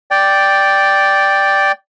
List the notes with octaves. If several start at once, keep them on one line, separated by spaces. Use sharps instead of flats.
D5 G5